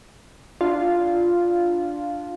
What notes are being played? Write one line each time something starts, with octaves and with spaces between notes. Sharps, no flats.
D4 F4